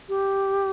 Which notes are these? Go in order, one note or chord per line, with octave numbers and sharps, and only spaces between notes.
G4